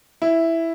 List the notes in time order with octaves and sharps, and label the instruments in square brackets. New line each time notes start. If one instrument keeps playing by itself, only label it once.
[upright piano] E4